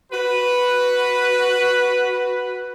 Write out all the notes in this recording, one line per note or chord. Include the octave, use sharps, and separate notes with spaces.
F#4 B4